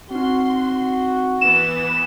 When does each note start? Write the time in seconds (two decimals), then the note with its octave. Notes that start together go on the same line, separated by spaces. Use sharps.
0.11 C4 D#4 F#4 C6
1.41 E3 B3 B4 E7